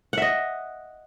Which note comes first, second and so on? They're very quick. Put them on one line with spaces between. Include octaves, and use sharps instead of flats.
F#5 E5 D#5